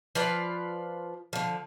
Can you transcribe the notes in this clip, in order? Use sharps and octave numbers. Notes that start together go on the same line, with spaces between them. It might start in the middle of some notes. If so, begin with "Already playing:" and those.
F3 F4 B4 D5
D3 F3